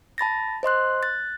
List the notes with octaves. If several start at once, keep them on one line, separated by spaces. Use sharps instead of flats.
A5 B5 A6 A#6
C5 D#5 C6 F#6
F#6 A6